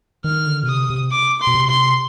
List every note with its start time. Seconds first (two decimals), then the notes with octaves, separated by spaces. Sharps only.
0.24 D#3 F6
0.47 D3
0.63 B2
0.68 C3 D#6
0.90 C3
1.11 D6
1.40 C6
1.47 B2
1.55 C3
1.69 C6